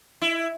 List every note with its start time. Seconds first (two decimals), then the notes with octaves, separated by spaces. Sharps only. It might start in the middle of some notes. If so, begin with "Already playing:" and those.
0.21 E4